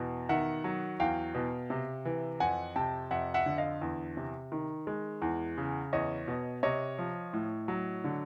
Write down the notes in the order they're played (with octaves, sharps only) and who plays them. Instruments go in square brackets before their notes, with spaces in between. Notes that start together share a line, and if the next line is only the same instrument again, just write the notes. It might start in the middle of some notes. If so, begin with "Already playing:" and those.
Already playing: [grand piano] E2 B2
D#3 E5 F#5
F#3
E2 F5 G5
B2
C3
E3
F2 F#5 G#5
C3 G5 A5
F2 E5 F#5
E5 F#5
D3
D#5 F5
E2
C3
D#3
G#3
E2
C#3
E2 C#5 D#5
B2
C3 C#5 D#5
F3
A2
F#3
D3